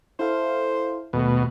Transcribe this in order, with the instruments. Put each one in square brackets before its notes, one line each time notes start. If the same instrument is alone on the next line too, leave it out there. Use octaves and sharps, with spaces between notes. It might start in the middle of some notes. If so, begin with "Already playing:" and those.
[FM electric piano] E4 A4 F5 [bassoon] C5
[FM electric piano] D#2 A3 [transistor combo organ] B2